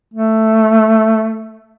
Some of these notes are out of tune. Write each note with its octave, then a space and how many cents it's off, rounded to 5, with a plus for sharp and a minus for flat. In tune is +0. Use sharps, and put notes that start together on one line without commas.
A3 +5